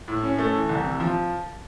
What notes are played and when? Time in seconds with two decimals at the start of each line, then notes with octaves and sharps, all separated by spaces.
0.08 A2
0.23 C#4
0.39 A3
0.54 E3
0.69 C2
0.84 C3
1.00 F3